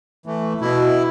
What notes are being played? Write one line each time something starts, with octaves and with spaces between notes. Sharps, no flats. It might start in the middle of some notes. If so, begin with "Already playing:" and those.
E3 A3
B2 E4